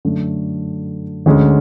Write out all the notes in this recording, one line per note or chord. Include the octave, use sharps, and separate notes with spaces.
F#2 D3 A3
D2 D3 G#3 C#4